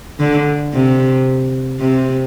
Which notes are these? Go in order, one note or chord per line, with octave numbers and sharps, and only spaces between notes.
D3
C3
C3